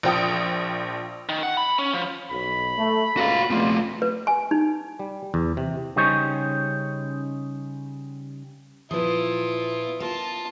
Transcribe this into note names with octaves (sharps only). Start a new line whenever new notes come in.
A#1 F3 G5 D#6
D#3
F#5
B5
C#4
F3
B1 B5
A3
C#2 A#2 A#3 F#4 F5
E2 B2 A3 C4 F4
B4
G#5
D#4
G3
E2
C3
C#3 G3 C#4 D#4 C5 C#5
A#2 F3 E4 F4 B4 D#6
A#3 F4 A5